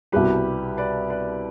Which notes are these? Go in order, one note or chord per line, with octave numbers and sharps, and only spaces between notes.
C2 B2 G3 G4 B4
B4 D5
B4 D5